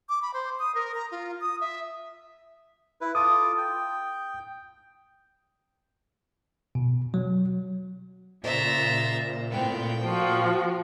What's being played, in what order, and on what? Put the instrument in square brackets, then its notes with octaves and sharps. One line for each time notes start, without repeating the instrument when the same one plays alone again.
[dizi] D6
B5
C5
D#6
A#4
A#5
F4
D#6
E5
[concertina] E4 B4
[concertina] F4 A4 D6 [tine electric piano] D#6
[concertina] G5
[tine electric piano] B2
F#3
[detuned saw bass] A#2 [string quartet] C#3 C5 A6 [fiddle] E5 A#5
[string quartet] A2 B3 C4 [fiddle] G5
[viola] F3 F#4 [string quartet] F4